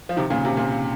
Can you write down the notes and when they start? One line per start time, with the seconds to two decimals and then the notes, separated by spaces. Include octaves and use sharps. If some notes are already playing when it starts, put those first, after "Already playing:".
0.09 F3
0.17 C3 D#3
0.30 A#2 C#3
0.45 C3
0.57 A#2